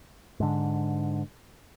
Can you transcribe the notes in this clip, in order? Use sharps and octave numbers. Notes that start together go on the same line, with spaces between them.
G#2 D3